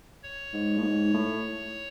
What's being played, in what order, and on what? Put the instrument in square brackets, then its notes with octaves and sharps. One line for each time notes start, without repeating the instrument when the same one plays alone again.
[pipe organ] C#5
[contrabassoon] G#2
A2
G#2
A2